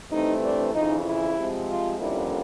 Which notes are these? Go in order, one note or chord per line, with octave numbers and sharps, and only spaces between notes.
G2 E3 A3 C4 D#4
D4
F2 C#3 E3 D#4
E4
C3 F3 G#3 C4
F4
F2 D3 G3 A#3 C#4 E4